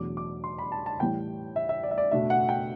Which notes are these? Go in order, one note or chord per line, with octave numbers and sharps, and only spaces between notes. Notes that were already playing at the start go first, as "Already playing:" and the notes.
Already playing: E2 B2 F#3 A3 D4 D6
D6
C6
B5
A5
A5
A2 E3 G3 G5
E5
E5
D5
E5
D5
B2 A3 D4 E5
F#5
G5